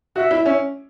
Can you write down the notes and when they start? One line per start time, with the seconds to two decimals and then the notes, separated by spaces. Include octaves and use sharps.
0.16 F#4 E5
0.31 E4
0.46 C#4